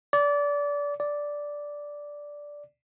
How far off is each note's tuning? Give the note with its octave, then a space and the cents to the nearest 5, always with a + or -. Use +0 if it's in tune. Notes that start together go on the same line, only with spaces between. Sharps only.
D5 -25
D5 -5